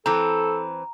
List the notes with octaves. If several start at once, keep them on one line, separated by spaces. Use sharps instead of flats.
E3 C4 A4 A#5